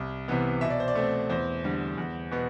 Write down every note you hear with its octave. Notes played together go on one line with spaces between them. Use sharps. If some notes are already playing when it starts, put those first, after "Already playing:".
Already playing: C2
C3 E3 B3
B2 E5
D5
C5
D5
A3 C4
E2 C5
D3 G3
E2
B2 B3